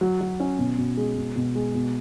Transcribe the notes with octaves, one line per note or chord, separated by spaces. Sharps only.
F#3
F#3
C#4
B2
B2
G#3
B2
B2
G#3
B2